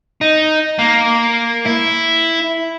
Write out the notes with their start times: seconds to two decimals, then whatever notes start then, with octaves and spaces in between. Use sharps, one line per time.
0.21 D#4
0.79 A#3
1.66 E4